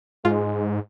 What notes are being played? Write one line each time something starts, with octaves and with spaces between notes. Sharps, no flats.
G#2 G#3 F4